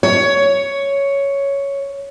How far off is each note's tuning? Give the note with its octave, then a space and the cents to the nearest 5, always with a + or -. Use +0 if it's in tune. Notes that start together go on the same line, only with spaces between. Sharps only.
C#5 +5